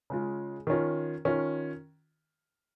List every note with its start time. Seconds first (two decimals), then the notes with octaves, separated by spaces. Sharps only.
0.10 C#3 G#3 F4
0.67 D#3 C#4 F4
1.25 D#3 C#4 F4